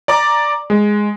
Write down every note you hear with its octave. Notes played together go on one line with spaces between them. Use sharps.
D5 A#5 D6
G#3